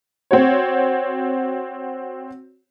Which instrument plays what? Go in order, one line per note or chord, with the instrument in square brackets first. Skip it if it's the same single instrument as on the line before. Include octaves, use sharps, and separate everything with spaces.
[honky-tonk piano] C4 F#4 C#5